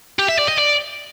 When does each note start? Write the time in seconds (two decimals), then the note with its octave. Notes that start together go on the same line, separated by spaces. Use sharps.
0.19 G4
0.29 E5
0.39 D5
0.49 D#5
0.58 D5